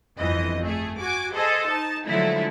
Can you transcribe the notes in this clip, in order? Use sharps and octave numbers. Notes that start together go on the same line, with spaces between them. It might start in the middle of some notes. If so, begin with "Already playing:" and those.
G1 F2 E3 D#5
A3 G#4
F#4 G#5 D6
G#4 A4 C5 D#5
D#4 A5
D3 F3 F#3 G#3 A3 E4